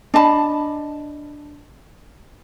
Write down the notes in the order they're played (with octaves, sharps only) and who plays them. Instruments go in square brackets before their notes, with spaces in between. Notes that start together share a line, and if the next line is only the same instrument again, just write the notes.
[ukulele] D4 D#5 A5 B5